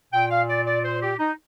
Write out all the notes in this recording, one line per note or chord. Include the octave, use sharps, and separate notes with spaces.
A#2 G5
F5
D5
D5
C5
G4
D#4